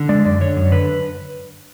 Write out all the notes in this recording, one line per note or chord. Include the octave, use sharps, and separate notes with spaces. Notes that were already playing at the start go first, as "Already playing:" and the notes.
Already playing: D3
G#3 D5
F#2 D5
D3 C#5
F#2
D3 B4